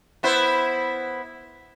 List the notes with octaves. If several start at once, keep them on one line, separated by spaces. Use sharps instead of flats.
B3 E4 C5